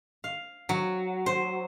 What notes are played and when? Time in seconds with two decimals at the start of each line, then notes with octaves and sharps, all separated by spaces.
0.24 F5
0.69 F#3
1.26 C5